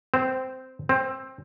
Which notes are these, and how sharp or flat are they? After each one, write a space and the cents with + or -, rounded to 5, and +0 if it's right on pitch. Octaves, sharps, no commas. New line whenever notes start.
C4 -10
C4 +15